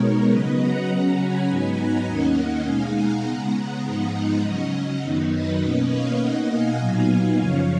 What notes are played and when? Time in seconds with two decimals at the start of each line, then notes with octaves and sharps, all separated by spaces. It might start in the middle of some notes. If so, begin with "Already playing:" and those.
Already playing: B2 G#3 B3 D#4 A#4 C#5
0.28 C#3 F#3 B3 B4 D#5
0.58 F#5 A#5
0.88 C#3 F#3 C#4
1.17 G#5 B5
1.46 G#2 F#3 B3 D#4 G#5 B5
1.76 F#5 A#5
2.05 D#2 D#3 A#3 C#4 D#5 F#5
2.64 B2 G#3 D#4 F5 G#5
2.94 F#5 A#5
3.24 C#3 G#3 B3 F#5 A#5
3.83 G#2 F3 G#3 B3 D#4 F#5 A#5
4.13 D#5 F#5
4.42 C#3 F#3 C#4
5.01 F#2 D#3 F#3 B3 D#4
5.31 B4 D#5
5.60 B2 A#3 C#4
5.90 C#5 F5
6.20 B2 A#3 D#4 D#5 F#5
6.49 F5 G#5
6.79 A#2 F#3 B3 D#4
7.37 F#2 C#3 F3 C#5 F5